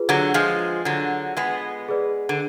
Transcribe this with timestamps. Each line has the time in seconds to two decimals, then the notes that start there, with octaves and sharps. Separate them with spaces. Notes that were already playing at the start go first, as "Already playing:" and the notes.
Already playing: F4 G#4 B4
0.09 D3 F#3
0.34 F3 G#3
0.85 D3 F#3
1.37 G#3 B3
1.88 G#4 B4 D5
2.29 D3